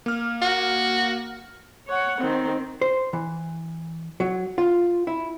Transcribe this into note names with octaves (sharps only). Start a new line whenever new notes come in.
A#3 F6
F#4
C#5 F#5
D#3 C4
C5
E3
F#3
F4
E4